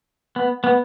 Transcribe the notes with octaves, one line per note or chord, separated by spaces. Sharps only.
B3
B3